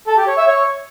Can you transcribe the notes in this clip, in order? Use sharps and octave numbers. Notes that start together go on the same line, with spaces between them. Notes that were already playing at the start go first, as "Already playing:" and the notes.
A4
G4
C#5
E5
C#5